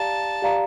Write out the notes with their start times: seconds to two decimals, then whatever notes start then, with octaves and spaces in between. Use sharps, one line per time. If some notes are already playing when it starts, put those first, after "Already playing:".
Already playing: G4 D5 F5 A5 A#5
0.42 G4 D5 F5 A#5